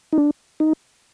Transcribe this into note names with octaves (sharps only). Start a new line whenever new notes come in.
D#4
D4
D#4